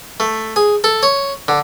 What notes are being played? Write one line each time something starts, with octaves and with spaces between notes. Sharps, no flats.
A3
G#4
A4
C#5
D3